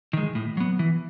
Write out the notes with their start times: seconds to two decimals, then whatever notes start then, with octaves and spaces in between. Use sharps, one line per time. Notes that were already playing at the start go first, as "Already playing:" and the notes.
0.13 D#3 G#3
0.35 A2
0.57 F#3 B3
0.79 E3